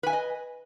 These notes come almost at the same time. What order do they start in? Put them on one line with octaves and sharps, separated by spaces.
B4 G#5 E5 D#5